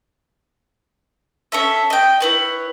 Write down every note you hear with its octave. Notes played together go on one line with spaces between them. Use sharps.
C#4 A4 E5
D#5 G5
E4 B4 C#5